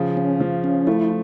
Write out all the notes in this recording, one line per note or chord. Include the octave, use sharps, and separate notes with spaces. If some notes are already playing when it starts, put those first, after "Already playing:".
Already playing: C#3 F3
C#4
F3
C#4
A3 E4